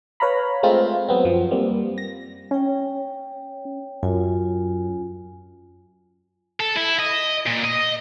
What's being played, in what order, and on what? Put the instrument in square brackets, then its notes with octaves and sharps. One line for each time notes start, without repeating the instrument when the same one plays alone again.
[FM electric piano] B4 C#5 F5 A#5 B5
G#3 A3 C4 F4
F#3 B3 C4
F#2 F3
G3 A#3 C4
A#6
[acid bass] C#4 [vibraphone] C#5 G5
[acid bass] F#2 [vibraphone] F4 G#5
[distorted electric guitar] A4
E4
D#5
A#2
D#5